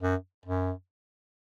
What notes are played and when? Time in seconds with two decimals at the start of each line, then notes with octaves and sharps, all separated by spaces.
0.02 F#2
0.46 F#2